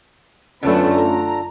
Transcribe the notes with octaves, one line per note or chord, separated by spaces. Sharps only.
F#2 D3 A3 B3 C#4 D4 F4
A#5